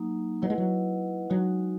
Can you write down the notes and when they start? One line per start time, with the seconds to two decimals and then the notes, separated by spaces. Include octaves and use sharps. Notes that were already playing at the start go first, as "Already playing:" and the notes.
Already playing: F#3 A#3 D#4
0.42 F#3 E4 B4 D#5 F#5
0.50 G#3
0.58 F#3
1.30 F#3 G#3 D#4 F#4